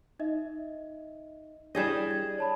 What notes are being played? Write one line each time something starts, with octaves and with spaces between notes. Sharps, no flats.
D#4 D#5 E5
G3 D4 E4 G#4 D#5 E7
G#6
C#5 A5 B5